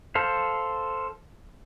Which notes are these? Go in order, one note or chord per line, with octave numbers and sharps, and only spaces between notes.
A4 C5 F5